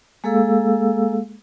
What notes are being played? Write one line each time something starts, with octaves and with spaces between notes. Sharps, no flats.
G#3 A#3 G#4 A4 F5 E6